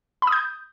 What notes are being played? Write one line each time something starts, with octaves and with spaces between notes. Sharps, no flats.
B5
D#6
G6